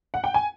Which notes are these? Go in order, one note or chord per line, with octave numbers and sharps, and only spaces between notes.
F#5
G5
G#5